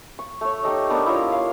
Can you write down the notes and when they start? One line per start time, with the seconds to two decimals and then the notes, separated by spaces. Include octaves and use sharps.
0.19 C#6
0.41 A3 C#5
0.63 D#4 G4 A4 D#5
0.90 B3 D4 D#4 A#4
1.06 E4 F4 A#4 C#5
1.32 F5